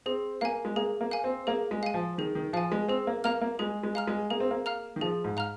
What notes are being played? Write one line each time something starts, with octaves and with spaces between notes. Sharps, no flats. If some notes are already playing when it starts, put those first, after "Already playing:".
C4 G#4
A#3 F5 G#5
G#3
A#3 G#4
A#3
F5 G#5
C4
A#3 G#4
G#3
F5 G#5
F3
D#3 G#4
D#3
F3 F5 G#5
G#3
C4 G#4
A#3
A#3 F5 A#5 F6
A#3
G#3 G#4
G#3
F5 A#5 F6
G#3
A#3 G#4
C4
A#3
F5 A#5 F6
D#3
F3 G#4
G#2
F5 A#5 F6